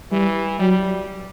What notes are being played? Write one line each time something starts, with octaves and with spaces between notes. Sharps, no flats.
E3 G3
F#3 G3